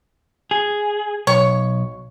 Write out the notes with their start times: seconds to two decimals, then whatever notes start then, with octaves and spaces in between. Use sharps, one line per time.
0.51 G#4
1.27 B1 C#5